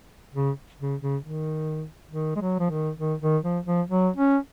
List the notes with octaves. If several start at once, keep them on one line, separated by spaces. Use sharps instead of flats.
C#3
C#3
C#3
D#3
D#3
G#3
F#3
F3
D#3
D#3
D#3
F3
F3
F#3
C#4